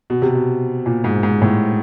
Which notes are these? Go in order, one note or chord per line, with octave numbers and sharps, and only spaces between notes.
B2
C3
B2
A#2
G#2
G#2
A2